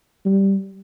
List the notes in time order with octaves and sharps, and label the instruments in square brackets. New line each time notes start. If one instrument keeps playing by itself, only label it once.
[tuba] G3